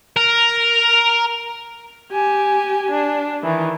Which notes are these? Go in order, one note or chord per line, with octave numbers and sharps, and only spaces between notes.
A#4
G4 G#5
D4
D#3 E3